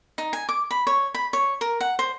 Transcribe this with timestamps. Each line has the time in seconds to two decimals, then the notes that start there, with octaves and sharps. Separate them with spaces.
0.18 D#4
0.33 G#5
0.49 D6
0.71 B5
0.87 C#5
1.14 B5
1.33 C#5
1.61 A#4
1.80 F#5
1.99 C5